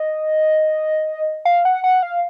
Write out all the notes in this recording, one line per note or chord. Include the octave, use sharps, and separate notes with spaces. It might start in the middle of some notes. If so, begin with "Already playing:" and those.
Already playing: D#5
F5
F#5
F#5
F5